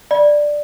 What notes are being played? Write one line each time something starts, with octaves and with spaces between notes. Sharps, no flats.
D5